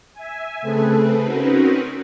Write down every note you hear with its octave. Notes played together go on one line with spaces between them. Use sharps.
E5 G#5
C#3 A3 C4 G#4 A4 B4
C4 C#4 D#4 F#4 A#4 B4